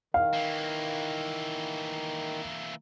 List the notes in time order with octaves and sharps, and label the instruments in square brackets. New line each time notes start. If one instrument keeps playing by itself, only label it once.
[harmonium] D#3 [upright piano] F5
[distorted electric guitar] E3 A#3